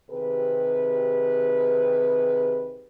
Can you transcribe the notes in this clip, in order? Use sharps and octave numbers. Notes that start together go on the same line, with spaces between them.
C3 D#3 G4 G#4 B4